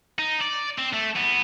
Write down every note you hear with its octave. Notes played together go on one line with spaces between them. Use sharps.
D#4
D5
C4
A3
E2 B3